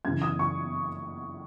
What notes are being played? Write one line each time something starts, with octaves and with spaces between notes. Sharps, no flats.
F#2 C#3 E3 G#6
D#6
C#6